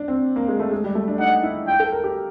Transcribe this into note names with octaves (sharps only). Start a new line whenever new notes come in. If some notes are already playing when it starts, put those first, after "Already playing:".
Already playing: D4
C4
A#3
G#3
A3
G#3
G3
A3
D4
D#4 F#5
E4
F4 G5
A4
A#4
G4